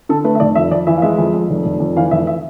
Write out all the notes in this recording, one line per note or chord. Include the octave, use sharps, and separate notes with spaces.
D3 A4
A3 B4
E5
F1 D5
F2 E5
F2 D5
E3 E5
F5
G#3 E5
F2
F2
F1
F1
F2
E3 F5
F1 E5
E5